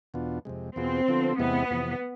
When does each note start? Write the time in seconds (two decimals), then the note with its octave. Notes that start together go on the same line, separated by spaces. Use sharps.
0.14 E2 B2 B3 D4 F4
0.45 F2 C3 G#3
0.76 E2 B2 B3 C4 F4 G#4
1.08 D3 F3 B3 F4 A4
1.39 E2 C3 G#3 B3 C4 E4
1.70 F2 C3 E3